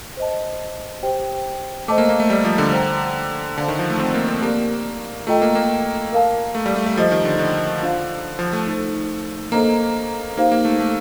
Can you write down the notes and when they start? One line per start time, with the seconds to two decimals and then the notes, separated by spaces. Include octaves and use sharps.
0.17 C5 D#5 A5
1.03 G4 C5 G5
1.88 A3 C5 D#5 A5 D6
1.98 A#3
2.09 A#3
2.20 A3
2.30 G3
2.45 F3
2.58 D3
2.72 C5 G5 A#5
3.57 D3 C5 F5 A5
3.68 D#3
3.79 F3
3.90 A3
3.99 C4
4.14 A#3
4.28 C4
4.42 A#3 G4 A#4 D5
5.27 A3 F4 A4 D#5 G5 A#5
5.42 A#3
5.55 A#3
6.13 A#4 F5 A5
6.55 A3
6.66 G3
6.76 A3
6.86 A3
6.97 F3 G4 C5 D#5
7.11 D#3
7.25 D3
7.39 D3
7.83 D4 F4 C5 F5
8.39 F3
8.53 A3
8.66 D#4 A4 C5
9.52 A#3 D4 A4 C5 D#5 A#5
10.37 A#3 D#4 G4 C5 F5
10.51 A#3
10.65 A3
10.80 A3